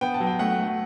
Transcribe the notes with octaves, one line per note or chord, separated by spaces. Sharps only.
B3 G5
A5
F#3
G5
A3 F#5
A3